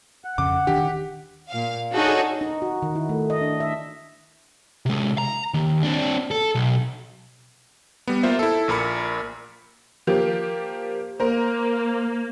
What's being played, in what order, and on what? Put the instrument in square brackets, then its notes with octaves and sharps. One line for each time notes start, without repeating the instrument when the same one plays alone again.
[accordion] F#5
[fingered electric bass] F2 C#3 [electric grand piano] D6
[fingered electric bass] D#1 D#3 D4 [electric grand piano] G4
[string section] A#2 F5
D4 D#4 F#4 G#4 A4 C#5
[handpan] D#4
F#4
D#3
E4
A3
D#5
D4
E5
[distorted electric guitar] C3 G#3
A#5
D#2
C4 D4
A4
B1
[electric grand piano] G3 B3
A#3 F4 C5 E5
E4 A4
A#1 A#2 A#4 B5 C#7
[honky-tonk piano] F3 A#3 G4
[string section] A#3 [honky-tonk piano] A#4 C5